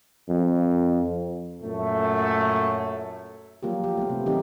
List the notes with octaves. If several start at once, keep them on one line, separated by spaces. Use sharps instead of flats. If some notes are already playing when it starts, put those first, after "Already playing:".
F2
F#2 A#2 A3
F3 F#3 A#3 F4 G4
F3 G4
A3 B3
C3
D#3 F#3 C4 D#4 G4